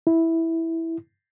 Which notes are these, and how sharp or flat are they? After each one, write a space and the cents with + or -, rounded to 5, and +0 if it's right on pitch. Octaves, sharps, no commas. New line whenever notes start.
E4 -5